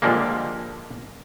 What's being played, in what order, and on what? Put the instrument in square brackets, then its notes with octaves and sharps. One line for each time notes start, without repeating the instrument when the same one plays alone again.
[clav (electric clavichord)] A#2 D3 F3 G3 G#3 A#3